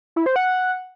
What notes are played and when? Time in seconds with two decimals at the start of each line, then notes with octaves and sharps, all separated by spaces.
0.16 E4
0.26 C5
0.36 F#5